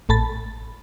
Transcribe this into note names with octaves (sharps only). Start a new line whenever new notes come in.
A1 A2 A5 B5 A6